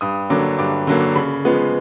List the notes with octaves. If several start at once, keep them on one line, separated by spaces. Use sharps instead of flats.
G2 D#6
D3 F#3 A#3 D6
G2 D6
D3 F#3 A#3
C#3 B5
F3 G#3 B3